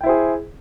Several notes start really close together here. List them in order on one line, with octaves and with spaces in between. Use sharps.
G5 E4 C5 G#4